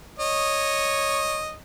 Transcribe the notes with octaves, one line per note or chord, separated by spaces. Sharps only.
C#5 D#5